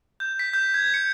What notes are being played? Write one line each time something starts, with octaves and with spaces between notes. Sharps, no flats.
G6
B6
G6
G#6
C#7